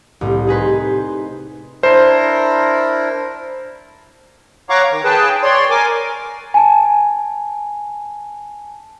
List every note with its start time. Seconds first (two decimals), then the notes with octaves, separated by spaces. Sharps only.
0.21 C2 A2
0.47 D#4 G#4 B4 C5
0.85 C5
1.83 D4 E4 A#4 C5
4.70 C#5 F5 F#5 A#5 C#6 D6
4.91 D#3
5.05 G#4 B4 G5 A5
5.43 C#5 D5 C6
5.70 A#4 G#5 D6
6.54 G#5 A5